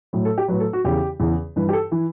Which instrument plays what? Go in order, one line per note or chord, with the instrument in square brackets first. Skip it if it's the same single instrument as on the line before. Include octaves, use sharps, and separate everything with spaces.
[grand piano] A2 F#3
A4
G4
A2 F#3 B4
A4
F#4
E2 C#3 E3 G4
E2 C#3 E3
G2 E3 B4
G4
A4
E3